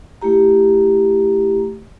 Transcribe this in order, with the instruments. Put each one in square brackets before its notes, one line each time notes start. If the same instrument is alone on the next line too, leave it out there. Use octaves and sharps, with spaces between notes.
[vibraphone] A3 E4 G4 A#5